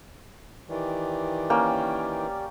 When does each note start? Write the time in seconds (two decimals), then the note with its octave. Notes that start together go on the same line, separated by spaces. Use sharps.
0.69 D#3 E3 G4 D5
1.50 A#3 C#4 G5